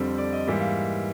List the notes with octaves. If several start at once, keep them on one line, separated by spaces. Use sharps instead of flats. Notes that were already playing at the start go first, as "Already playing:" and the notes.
Already playing: F2 D3 G3 C4
D5
D#5
G#2 E3 G3 A#3
F5